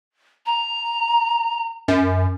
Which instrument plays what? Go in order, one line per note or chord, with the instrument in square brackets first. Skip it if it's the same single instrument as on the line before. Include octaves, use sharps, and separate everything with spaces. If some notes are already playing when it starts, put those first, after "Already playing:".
[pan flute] A#5
[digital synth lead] F#2